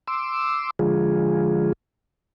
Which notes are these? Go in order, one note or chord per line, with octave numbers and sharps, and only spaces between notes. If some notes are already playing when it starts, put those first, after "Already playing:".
C6 D6 E6
D3 F3 G#3 F4 G#4